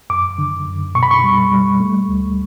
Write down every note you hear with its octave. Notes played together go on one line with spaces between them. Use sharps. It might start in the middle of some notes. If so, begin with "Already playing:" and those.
F#2 D6
D3
F#2
B2 C#6
B5
C#6
G3
G3
A3
D2